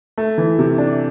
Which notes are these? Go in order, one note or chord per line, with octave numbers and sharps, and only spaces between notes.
A3
E3
C3
D4